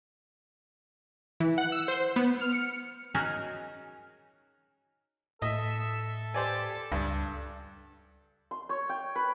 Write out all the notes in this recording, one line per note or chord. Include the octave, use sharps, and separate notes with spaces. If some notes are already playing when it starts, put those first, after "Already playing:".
E3
F#5
E6
C5
B3
F6
C#7
C#4 D#4 F#4 G#4 A#4
A2 A4 D#5 E5
G4 C5 D5 G#5 A5
C#2 G2 D4
C6
C#5
G5
B4